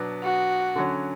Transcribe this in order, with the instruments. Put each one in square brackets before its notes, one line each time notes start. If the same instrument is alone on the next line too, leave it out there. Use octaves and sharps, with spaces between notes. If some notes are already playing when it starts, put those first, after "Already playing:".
Already playing: [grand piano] B2 F#3 B3 D4
[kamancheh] F#4
[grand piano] D3 F#3 C#4